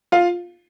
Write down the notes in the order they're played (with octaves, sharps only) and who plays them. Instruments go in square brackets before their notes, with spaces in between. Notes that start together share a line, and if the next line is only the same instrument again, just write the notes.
[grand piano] F4 F5